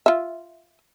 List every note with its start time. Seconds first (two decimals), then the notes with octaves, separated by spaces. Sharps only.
0.06 F4 E5